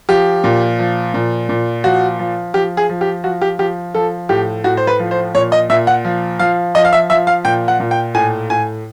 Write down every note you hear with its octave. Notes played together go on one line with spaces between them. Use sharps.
F3 G4
A#2
F3
A#2
A#2
F3 F#4
F3
F3 G4
G#4
F3
G4
F3 F#4
G4
F3 G4
F3 A4
A2 G4
A2 F#4
C5
B4
F3
C5
A#2 C#5
D#5
A#2 E5
F#5
F3
F3 F5
F3 D#5
F5
E5
F3 E5
F5
A#2 G5
F#5
A#2
G5
A2 G#5
A2 G#5